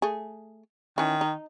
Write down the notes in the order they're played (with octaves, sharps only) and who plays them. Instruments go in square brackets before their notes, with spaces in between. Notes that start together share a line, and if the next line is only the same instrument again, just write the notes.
[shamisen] A3 G#4
[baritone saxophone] D#3 [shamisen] E3 C#4
[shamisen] D#4